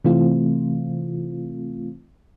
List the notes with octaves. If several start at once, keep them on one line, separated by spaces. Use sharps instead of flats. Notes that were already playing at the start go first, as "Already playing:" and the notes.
C3 E3 A3 C4 F4